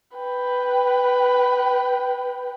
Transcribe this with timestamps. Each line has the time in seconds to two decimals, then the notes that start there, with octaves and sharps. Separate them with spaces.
0.17 B4 G5